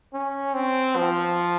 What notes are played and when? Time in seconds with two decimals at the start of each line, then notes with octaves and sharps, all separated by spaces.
0.13 C#4
0.54 C4
0.96 F3